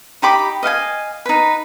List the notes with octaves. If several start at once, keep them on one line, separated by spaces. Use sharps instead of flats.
D#4 G4 B5 D6
D#5 F5 F#5 G#5
D#4 B4